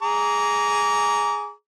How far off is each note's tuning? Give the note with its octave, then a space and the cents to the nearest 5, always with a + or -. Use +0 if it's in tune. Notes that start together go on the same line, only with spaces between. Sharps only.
G#4 +0 A#5 +0 D6 -35